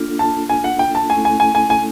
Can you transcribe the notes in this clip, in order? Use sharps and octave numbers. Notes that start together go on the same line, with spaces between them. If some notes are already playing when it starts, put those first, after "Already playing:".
Already playing: A#3 D4 F4 A4
A5
G#5
F#5
G5
A5
A3 C#4 E4 A4 G#5
G#5
G#5
G#5
G#5